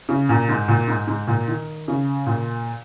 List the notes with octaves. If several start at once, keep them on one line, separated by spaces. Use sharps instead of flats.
C#3
A#2
G#2
A#2
G#2
G#2
A#2
D#3
C#3
A#2